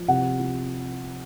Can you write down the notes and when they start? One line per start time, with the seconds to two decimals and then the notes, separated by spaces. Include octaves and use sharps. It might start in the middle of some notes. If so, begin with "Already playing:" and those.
Already playing: F3
0.08 C3 F#5
0.39 F3